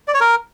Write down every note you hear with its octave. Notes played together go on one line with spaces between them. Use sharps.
D5
C#5
A#4